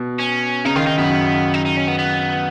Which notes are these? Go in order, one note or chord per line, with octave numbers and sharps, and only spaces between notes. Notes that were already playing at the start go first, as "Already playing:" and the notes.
Already playing: B2
C#4
C#3 D#4
D#3 F4
D#3 D#4
F#2 B3
F#2
D#4
D#4
C#4
B3
B3